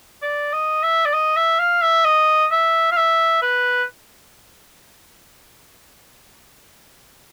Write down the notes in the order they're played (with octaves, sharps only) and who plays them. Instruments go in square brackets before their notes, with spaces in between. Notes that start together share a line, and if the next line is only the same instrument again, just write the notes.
[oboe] D5
D#5
E5
D5
D#5
E5
F5
E5
D#5
E5
F5
E5
B4